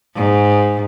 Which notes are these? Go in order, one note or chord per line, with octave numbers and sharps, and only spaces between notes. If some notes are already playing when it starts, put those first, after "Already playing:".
G#2